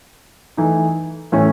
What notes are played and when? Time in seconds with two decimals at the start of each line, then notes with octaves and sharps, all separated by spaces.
0.57 E3 A3 D#4
1.32 A2 E3 A3 C#4